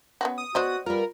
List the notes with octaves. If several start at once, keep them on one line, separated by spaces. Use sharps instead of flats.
B3 C#4 F#4
D#6
B3 F#4 C5 D5 D#5
G3 F4 A#4 B4